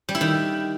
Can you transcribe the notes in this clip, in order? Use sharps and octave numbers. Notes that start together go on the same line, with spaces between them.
G3
E4
D#3